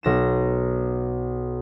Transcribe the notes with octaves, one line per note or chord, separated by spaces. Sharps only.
B1 A#6 E7